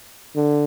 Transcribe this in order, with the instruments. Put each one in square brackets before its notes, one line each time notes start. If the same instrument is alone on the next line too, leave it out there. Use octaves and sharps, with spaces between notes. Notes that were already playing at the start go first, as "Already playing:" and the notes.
[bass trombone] D3